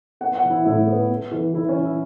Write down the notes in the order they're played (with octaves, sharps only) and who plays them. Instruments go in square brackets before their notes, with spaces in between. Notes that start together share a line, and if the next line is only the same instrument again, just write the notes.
[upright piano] B3 [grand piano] F#5
[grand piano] F#5
[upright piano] E3
[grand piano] E4
[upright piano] A2 [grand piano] E4
[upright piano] B3
B3
E3
[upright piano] E3 [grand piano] E4
[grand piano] C#4
[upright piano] E3
[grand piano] E4